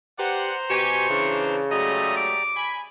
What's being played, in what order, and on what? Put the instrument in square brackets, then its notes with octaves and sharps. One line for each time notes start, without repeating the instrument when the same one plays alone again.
[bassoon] G4 [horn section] B4 D5 F#5 [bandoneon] C5 A#5 C6
[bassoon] B2 [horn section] G4 G#5 [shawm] C#6
[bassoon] C#3 [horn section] E3 D4
[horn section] F#3 G#3 A3 [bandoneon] G4 D5 A#5 [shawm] D#5
[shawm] D6
[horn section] G#5 B5